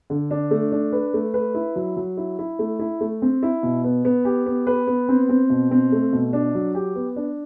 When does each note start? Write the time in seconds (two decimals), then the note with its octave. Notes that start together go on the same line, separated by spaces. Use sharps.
0.10 D3
0.31 D4
0.51 A3
0.72 D4
0.92 B4
1.14 A3
1.34 B4
1.55 E4
1.76 F#3
1.97 F#3
2.17 E4
2.39 E4
2.59 A3
2.79 E4
3.01 A3
3.22 C4
3.43 E4
3.63 B2
3.84 B3
4.05 B3
4.25 G4
4.46 B3
4.67 B4
4.87 B3
5.09 C4
5.29 C4
5.50 B2
5.71 C4
5.92 A3
6.13 B2
6.33 D4
6.55 F#3
6.75 G4
6.95 B3
7.16 D4